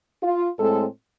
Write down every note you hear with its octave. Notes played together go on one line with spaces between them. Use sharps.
F4
A2 G#3 C4 A4